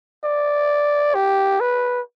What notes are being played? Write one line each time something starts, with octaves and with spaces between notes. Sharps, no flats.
D5
G4
B4